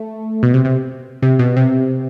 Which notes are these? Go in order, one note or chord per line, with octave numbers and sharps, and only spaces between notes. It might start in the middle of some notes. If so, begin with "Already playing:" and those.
Already playing: A3
B2
C3
C3
C3
B2
C3